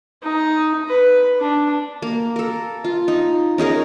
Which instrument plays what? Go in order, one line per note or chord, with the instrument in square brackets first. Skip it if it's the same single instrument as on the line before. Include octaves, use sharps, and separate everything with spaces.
[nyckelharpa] D#4
B4
D4
[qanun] A#3
A4 A#4
F4
D#4
C#4 D#4 G#4 A#4